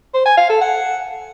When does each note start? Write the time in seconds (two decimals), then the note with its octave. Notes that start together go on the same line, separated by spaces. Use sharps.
0.14 C5
0.26 G#5
0.37 F5
0.49 A4
0.61 F#5